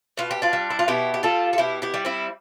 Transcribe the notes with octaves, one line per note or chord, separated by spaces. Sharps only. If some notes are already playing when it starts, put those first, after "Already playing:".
B2 F4
G4
D4 F4
G3
E4
F4
B2 E4 G4
G4
G3 F4 A4
A4
B2 E4 G4
E4 G4
G3
C4 E4